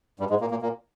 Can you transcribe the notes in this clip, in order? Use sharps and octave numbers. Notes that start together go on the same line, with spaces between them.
G2 G3
G#2 G#3
A#2 A#3
A#2 A#3
A#2 A#3